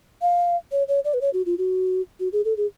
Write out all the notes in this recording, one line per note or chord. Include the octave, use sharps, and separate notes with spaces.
F5
C#5
C#5
D5
B4
C#5
F#4
F4
F#4
F#4
G#4
A4
G#4